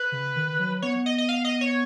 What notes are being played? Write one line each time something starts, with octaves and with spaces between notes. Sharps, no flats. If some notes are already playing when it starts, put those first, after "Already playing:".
Already playing: B4
C#3
D#3
F#3
B3 C#5
D#5
D#5
F5
D#5
C#5